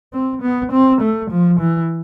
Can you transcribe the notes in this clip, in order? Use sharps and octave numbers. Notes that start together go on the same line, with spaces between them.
C4
B3
C4
A3
F3
E3